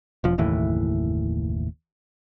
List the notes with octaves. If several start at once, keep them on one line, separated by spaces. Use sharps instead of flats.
E1 F3
F#1 D#2 A2 E3